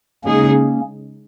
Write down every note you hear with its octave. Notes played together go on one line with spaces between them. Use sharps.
C#3 G#3 A#3 C#4 D#4 G#4